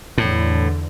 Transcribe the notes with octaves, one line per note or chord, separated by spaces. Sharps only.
E2 A2 D3